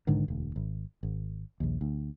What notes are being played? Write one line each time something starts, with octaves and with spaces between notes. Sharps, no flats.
B1 G#2 D3 D#3
E1 D2
G#1
G#1
A#1 D#2
D2